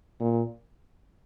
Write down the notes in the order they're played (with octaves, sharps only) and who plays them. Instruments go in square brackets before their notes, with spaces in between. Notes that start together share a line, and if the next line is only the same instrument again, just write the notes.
[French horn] A#2